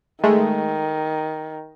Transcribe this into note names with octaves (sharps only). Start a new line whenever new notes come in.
D#3 G#3 A3